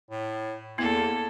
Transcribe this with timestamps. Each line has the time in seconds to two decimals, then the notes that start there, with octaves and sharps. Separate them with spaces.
0.11 A2
0.78 E2 A#3 B3 E4 A4